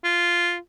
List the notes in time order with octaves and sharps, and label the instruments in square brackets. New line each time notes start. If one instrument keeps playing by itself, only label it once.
[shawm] F4